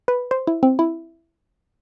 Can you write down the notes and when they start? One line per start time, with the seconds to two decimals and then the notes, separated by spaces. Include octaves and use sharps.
0.08 B4
0.31 C5
0.47 E4
0.63 C4
0.79 E4